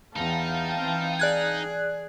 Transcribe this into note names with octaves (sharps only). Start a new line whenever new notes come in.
E2 D#4 F5 G5 A5
E3 C4
G#4 D5 F#6 G#6